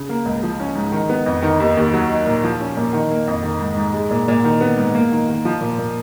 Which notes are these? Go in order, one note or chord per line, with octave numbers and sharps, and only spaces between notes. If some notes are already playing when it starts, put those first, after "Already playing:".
Already playing: C#3
A#3
C#2
F3
C#4
G#2
D#3
B3
F2
D#3
D#2
D#2
F#3
D#4
A#2
F3
C#4
A#2
D#3
A#3
F2
D#3
G#2
G#2
G#3
A#2
A#2
D#3
B3
G#2
A#3
D#3
D#3
F3
A#2
A#2